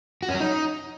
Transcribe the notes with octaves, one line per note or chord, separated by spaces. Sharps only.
F#4
C#4
F#3
D#4